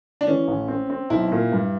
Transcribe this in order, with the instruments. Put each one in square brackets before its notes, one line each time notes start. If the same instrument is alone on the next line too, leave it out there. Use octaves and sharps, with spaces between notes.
[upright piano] D4
[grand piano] E3 [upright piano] C#4
[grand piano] A1
C4
C4
[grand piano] B1 [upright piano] E4
[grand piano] A#2
G2